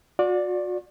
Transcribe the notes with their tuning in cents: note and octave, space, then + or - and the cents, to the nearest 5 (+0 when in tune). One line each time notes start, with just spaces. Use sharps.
F#4 -40 D5 +0